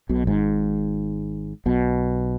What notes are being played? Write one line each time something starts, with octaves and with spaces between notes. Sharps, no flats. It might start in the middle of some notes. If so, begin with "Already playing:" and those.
B1 B2
G#1 G#2
B1 B2